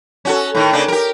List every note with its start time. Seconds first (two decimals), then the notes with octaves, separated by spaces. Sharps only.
0.25 C#4 F#4 A4
0.55 A2 D#3
0.73 C#3 A#3 D4
0.88 G4 A#4